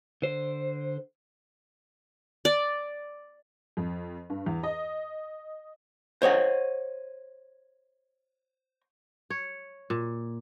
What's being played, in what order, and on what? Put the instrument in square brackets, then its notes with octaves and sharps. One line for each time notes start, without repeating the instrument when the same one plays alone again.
[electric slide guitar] D3 C5
[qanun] D5
[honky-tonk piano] F2
G2
E2
D#5
[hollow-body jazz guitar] C5 C#5 D#5 F#5
[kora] C#5
A#2